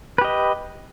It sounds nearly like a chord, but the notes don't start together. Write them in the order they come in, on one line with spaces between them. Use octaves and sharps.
B4 G4 D#5